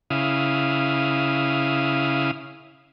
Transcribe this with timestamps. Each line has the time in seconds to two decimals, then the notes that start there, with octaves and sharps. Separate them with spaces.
0.10 C#3 E4 F5 D#6